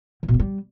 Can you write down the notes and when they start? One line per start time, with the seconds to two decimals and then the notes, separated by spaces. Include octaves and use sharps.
0.23 D#3
0.28 B2
0.34 A#3
0.39 G3